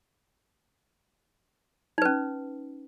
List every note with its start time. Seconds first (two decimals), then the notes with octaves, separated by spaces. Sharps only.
1.98 D#4
2.02 B4
2.05 C#4